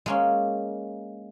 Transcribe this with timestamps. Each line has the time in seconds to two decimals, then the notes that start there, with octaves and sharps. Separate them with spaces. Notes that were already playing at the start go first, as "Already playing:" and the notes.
0.06 G#3 A#3 C#4